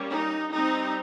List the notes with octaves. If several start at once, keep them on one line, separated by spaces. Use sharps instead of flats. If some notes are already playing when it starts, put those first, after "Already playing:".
Already playing: G3 A#3 C#4
D#4
G3 C4 D#4